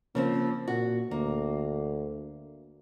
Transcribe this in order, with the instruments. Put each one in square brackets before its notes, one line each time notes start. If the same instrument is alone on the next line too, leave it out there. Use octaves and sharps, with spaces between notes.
[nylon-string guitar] C#3 F3 C4 [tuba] A#3
[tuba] A#2 [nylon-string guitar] F#4
[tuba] D2 [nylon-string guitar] A#3